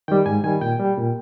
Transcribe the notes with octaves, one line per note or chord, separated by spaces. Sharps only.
D#3 G3 G5
G#2 G#5
D#3 G3 G#5
A#2 G5
G3
A#2